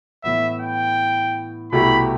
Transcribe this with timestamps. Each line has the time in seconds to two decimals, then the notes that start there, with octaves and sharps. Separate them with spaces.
0.24 A2 E3 B3 E5
0.61 G5
1.72 C2 B2 A3 E4 G4 B5